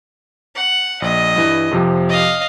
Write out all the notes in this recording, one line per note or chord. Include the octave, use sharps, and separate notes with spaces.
F#5
A#1 D#5
G2 E3
F2 C3 F3
D#5 F5